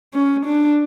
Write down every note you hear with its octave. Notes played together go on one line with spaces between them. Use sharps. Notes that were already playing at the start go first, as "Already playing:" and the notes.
C#4
D4